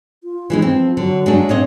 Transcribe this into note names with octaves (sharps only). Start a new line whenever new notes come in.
F4
E3 G#3 D#4
F3 C4
D3 F#3
G#3 A3 D4
A#2 C4 C#5 D#5